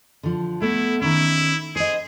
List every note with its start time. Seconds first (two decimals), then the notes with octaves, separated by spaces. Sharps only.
0.23 D3 F3
0.62 A3 B3 E4
1.02 D#3 C#4 E4
1.76 G#4 C5 D#5